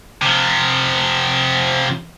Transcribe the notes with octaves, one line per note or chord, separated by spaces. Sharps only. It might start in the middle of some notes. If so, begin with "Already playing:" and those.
C3 F3